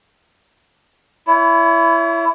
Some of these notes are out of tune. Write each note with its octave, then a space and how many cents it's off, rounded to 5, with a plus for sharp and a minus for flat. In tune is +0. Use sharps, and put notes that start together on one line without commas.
E4 +20 C#5 +40